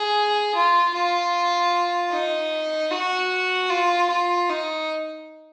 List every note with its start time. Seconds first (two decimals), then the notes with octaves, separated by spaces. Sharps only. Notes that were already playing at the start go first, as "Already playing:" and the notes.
Already playing: G#4
0.55 F4
0.94 F4
2.12 D#4
2.91 F#4
3.70 F4
4.10 F4
4.49 D#4